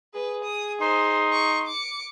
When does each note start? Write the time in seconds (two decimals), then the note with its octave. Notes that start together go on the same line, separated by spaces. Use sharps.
0.14 G#4 B4
0.44 D#6
0.81 D#4 C5 C6
1.32 C#6
1.67 D6 C#7